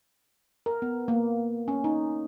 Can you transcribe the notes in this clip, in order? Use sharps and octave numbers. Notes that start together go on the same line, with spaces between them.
A#4
B3
A#3
C#4
D#4